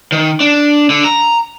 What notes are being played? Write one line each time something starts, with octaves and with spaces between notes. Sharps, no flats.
D#3
D4
D3
A#5